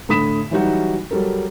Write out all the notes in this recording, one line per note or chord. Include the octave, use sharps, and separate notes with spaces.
A2 D3 B5 D#6 B6 E7
E3 F#3 G3 D#4 F#4
F#3 G3 A4 A#4